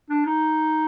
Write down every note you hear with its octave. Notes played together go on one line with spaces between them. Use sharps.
D4
D#4